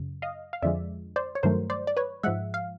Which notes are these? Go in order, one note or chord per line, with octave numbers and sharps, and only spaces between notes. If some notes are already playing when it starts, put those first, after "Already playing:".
Already playing: F#2 C#3
D#5 F5
F5
F2 D3 F3 G#3 D5 E5
C5 D5
C#5
G2 D#3 F#3 A3 A#4 C5
C5 D5
D5
B4 C#5
G#2 F3 G#3 E5 F#5
F5